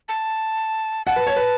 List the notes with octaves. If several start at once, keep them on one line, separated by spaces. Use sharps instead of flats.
A5
F#5 A5
B4
C#5
B4